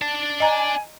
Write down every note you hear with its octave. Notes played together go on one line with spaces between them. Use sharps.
D5 A5
D#5 G#5 A#5